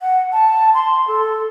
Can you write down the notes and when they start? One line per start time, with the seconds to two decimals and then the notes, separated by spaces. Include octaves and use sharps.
0.02 F#5
0.33 A5
0.74 C6
1.08 A4